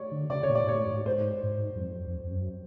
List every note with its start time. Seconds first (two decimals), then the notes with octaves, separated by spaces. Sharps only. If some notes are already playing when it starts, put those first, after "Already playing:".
Already playing: C#5 D5
0.11 D3
0.30 C#3 D5
0.43 C#5
0.49 A#2
0.55 D5
0.64 G#2
0.68 A2 C#5
0.87 G#2
1.06 G#2 C5
1.43 G#2
1.76 F#2
1.81 F2
2.07 F2
2.20 F2
2.31 F#2